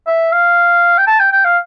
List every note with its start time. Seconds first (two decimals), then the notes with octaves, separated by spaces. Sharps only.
0.07 E5
0.32 F5
0.98 G5
1.07 A5
1.20 G5
1.32 G5
1.44 F5